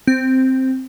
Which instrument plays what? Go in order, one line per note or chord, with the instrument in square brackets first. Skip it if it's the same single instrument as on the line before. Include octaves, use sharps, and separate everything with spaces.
[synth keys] C4